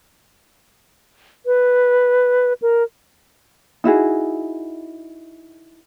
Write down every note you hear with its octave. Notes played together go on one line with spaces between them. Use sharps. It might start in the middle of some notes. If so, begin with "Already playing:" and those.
B4
A#4
D#4 E4 F#4 G#4